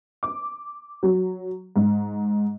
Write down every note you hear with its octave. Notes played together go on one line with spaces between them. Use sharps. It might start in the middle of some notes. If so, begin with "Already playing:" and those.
D6
F#3
G#2